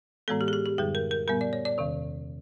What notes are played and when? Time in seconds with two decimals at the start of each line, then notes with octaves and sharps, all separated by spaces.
0.28 A2 E3 G#3 B3 A4
0.41 G4
0.48 G#4
0.53 G4
0.66 G4
0.78 F#2 D3 G3 G#4
0.95 A#4
1.11 A#4
1.28 A#2 G3 B3 A#4
1.41 D5
1.53 C#5
1.65 D5
1.78 E2 C3 D#3